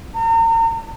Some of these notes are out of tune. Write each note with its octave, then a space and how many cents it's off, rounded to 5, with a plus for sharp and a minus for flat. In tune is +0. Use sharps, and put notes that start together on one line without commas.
A#5 -40